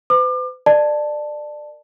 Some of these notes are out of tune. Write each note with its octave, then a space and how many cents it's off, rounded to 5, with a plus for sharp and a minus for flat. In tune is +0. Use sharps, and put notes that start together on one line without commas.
B4 +45 D6 +35
A#4 +0 D5 +20 A5 +0